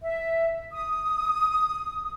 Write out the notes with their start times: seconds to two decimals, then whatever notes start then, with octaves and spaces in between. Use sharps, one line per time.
0.01 E5
0.72 D#6